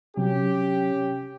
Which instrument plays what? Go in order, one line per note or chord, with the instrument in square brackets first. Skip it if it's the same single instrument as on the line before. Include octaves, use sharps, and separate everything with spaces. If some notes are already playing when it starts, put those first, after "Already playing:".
[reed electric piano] C3 F#3 [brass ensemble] C#4 G4